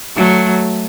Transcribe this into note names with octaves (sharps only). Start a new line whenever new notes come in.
F#3 A3